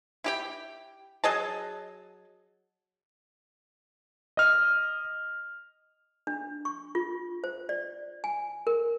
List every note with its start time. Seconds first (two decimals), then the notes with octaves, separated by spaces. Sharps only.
0.24 E4 G4 G5
1.24 F#3 G#4 D#5 A5
4.37 D#5 F6
6.27 D4
6.65 C#6
6.95 F4
7.44 C5
7.69 D5
8.24 G#5
8.67 A#4